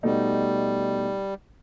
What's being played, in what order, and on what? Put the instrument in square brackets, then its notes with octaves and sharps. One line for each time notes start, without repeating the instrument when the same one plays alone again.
[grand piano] B2 A3 D#4 [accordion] G3